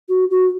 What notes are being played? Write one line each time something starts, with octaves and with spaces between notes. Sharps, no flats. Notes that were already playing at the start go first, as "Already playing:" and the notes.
F#4
F#4